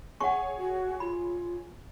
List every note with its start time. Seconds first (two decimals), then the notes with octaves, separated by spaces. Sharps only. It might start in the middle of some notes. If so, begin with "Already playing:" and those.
0.20 G#4 C#5 F#5 G#5 C#6
0.58 F#4
1.00 F4 B5